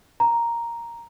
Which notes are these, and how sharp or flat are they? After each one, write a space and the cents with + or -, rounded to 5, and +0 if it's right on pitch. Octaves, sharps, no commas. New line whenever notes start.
A#5 +0